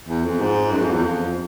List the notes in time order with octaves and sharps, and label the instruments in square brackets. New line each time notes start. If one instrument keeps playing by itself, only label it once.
[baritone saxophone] E2
F2
G#2
F#2
F2
E2
F2